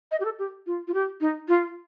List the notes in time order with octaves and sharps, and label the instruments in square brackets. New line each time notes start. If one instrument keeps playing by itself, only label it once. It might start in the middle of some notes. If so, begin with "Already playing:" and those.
[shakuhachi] D#5
G4
A4
G4
F4
F4
G4
D#4
F4